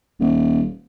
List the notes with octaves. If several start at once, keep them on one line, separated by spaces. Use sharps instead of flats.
D#1